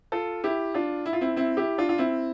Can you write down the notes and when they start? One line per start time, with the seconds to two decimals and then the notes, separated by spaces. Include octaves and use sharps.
0.12 F4 A4
0.44 E4 G4
0.74 D4 F4
1.06 E4
1.13 F4
1.21 C4 E4
1.36 C4 E4
1.57 E4 G4
1.78 D4 F4
1.89 F4
1.98 C4 E4